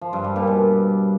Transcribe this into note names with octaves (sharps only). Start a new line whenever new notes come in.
F3
G2
G3
A#2
B2